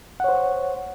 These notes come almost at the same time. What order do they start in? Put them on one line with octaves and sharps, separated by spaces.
F#5 C#5 C5